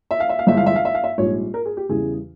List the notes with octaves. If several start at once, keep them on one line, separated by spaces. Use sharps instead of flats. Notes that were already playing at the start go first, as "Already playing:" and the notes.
E5
F5
E5
F5
G1 G2 E3 G#3 E5
F5
E5
F5
E5
F5
E5
A#1 G#2 G3 C#5
A#4
G#4
G4
E2 C#3 E3 G3 G#4